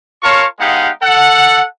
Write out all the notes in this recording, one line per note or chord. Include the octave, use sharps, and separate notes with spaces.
F4 A#4 C#5 F5 A5 C#6
G#3 B3 D#4 G4 F5 F#5
A4 F#5